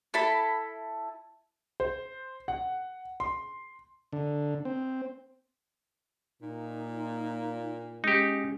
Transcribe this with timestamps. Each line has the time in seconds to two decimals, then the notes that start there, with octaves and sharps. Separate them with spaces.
0.14 E4 A4 A5 B5
1.80 C5
2.48 F#5
3.20 C6
4.13 D3
4.65 C4
6.42 A#2 D#4
8.04 G#3 C#4 D#4 G4